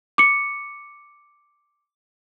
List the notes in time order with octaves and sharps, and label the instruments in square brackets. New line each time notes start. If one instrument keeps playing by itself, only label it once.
[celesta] D6 C#7